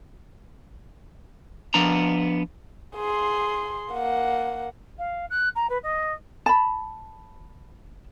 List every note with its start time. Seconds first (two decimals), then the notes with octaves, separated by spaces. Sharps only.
1.74 F3 B3 D4 A#5
2.96 G#4 C6
3.92 A#3 F#5
4.99 F5
5.30 F#6
5.56 A#5
5.70 B4
5.83 D#5
6.46 A5 B5